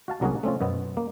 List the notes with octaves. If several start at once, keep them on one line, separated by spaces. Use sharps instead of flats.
F#4 F5 A5
C2 F#3 A#3 C#4 F#4 G#4
A3 C4 C#4 F4
F#2 B2 B3
A#3